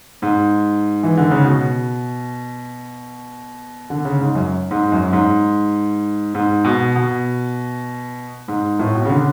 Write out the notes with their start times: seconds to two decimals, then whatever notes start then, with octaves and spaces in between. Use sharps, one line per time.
0.22 G#2
1.03 E3
1.17 D3
1.31 C#3
1.44 B2
3.90 D3
4.05 C#3
4.20 G#2
4.35 F#2
4.71 G#2
4.92 F#2
5.13 G#2
6.34 G#2
6.64 B2
6.96 B2
8.48 G#2
8.79 A2
8.95 B2
9.05 C#3
9.10 D3